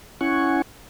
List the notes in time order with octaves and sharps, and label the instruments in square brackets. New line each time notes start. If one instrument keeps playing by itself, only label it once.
[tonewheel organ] C#4 E4 F#5 G#5 C#6